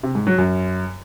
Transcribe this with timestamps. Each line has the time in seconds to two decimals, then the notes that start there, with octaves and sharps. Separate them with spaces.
0.03 C3
0.15 G#2
0.27 F#3
0.38 F#2